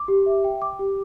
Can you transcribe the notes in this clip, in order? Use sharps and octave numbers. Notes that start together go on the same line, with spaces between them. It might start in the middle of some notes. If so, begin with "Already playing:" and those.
Already playing: D6
G4
E5
G5
D6
G4